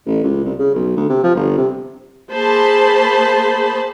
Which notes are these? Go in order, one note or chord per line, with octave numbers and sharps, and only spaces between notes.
A1
C#2
C2
C#3
B1
D2
C3
F3
G1
C3
A#3 G#4 C5 A5 B5